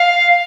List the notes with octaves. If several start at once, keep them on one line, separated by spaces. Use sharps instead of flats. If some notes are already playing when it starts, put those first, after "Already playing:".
Already playing: F5